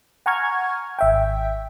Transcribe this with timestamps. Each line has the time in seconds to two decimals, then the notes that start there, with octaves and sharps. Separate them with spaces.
0.26 F#5 G#5 A#5 C#6 F6 G#6
0.99 G#1 E5 G5